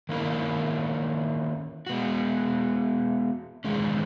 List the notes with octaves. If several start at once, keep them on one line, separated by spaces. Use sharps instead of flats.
D#3 A#3 C#4 E4 A#4
G#3 B3 F#4
E2 D#3 G#3 C#4